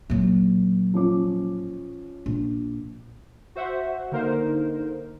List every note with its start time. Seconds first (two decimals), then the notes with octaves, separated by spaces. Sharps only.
0.10 A#2 F#3
0.94 F3 C#4 D6
2.26 A#1
3.55 F#4 C5 E5 F#5
4.12 D3 A#3 D#4 A#4 C5